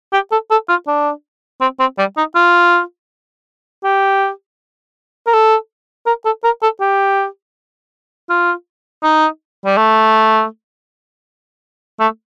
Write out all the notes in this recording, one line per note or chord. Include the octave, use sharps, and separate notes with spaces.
G4
A4
A4
F4
D4
C4
C4
G3
D#4
F4
G4
A#4
A4
A#4
A4
A#4
A4
G4
F4
D#4
G3
A3
A3